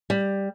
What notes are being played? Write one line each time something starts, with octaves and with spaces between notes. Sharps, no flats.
G3